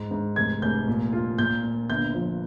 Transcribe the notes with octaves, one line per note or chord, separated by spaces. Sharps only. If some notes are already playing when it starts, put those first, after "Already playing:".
Already playing: G#2
G#2
F1 G#6
F1 G6
A#2
F4
A#2 G6
A#2
G1 G6
F3